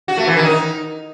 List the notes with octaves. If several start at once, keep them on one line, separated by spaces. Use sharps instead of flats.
F#4
A3
E3
D#3
D#4